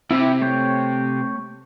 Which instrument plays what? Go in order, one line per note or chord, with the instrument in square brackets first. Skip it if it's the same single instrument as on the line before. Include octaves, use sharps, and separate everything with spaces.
[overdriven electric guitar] C3 [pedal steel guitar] E4 G4
[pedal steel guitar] A3 C#5 G5